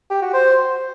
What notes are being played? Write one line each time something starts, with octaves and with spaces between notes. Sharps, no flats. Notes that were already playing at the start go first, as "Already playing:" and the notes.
G4
F#4
C5